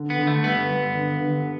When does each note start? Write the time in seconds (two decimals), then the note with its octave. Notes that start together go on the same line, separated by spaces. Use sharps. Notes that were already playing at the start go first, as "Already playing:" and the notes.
Already playing: D3
0.10 B3
0.18 D3
0.27 A3
0.44 G2 B3
0.70 G2
0.95 D3
1.20 D3